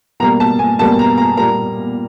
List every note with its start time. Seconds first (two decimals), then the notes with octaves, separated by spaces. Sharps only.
0.20 B2 G3 A#3 A#5
0.40 A5
0.59 G#5
0.79 B2 G3 A#3 A5
0.99 A#5
1.18 A#5
1.37 A#2 G3 A#3 A#5